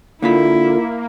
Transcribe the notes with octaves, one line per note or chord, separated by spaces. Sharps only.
D3 A#3 E4 F4 F5 B5